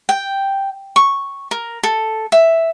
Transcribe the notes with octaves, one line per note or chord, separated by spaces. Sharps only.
G5
C#6
A#4
A4
E5